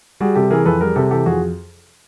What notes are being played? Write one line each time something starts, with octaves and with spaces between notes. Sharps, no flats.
G3 F#4 G#4
C3 G4 A4
E3 G#4 A#4
F2 A4 B4
G3 G#4 A#4
C3 G4 A4
E3 G4 A4
F2 F#4 G#4